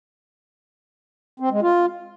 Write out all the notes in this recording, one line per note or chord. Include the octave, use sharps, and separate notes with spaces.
C4
G#3
F4